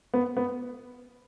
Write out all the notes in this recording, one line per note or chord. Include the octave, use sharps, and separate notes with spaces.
B3
B3